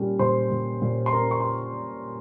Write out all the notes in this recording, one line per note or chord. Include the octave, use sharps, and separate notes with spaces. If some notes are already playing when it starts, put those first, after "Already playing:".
Already playing: A#2 G3 C#4
A#2 C5 C6
A#2
A#2
C6
C#4 A#4 A#5
C#6
C6